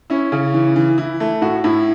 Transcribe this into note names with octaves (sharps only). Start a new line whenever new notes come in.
C#4 E4
C#3
E3
E3
E3 E4
A3
A2 F#4
A2 E4